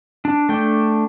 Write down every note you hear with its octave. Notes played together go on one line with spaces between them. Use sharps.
D4
A3 D4 G5